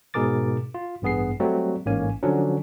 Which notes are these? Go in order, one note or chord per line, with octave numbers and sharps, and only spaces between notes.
G#2 B2 G#4 A#4 D6 A6
F4
A1 G2 B3 G#4 C7
F#3 G3 A3 C4
A1 G#2 A#3 C#4 G#5
D3 F3 F#3 C#4 D4